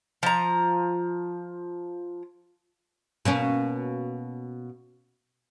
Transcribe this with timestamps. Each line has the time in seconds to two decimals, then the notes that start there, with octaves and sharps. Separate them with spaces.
0.23 F3 A#5
3.25 B2 A#3 C#4